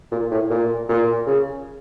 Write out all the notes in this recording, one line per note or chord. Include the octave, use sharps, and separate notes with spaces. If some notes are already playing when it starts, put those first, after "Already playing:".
A#2
A2
A#2
A#2
C#3